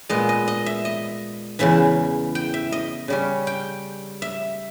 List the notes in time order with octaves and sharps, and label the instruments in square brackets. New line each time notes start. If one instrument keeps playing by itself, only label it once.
[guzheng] A#2 G#3 B3 D#5
D#5
D#5
E5
D#5
E2 C#3 E3 E5
G5
E5
D#5
C#3 G3 C#4
G5
E5